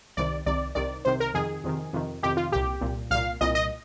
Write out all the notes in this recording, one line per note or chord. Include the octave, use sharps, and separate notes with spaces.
C2 C3 D#3 D5
C2 C3 D#3 D5
C2 C3 D#3 D5
C2 C3 D#3 C5
A#4
F2 C3 D#3 G#4
F2 C3 D#3
F2 C3 D#3
F2 C3 D#3 G4
F4
C2 A#2 G4
C2 A#2
C2 A#2 F5
C2 A#2 D#5
D#5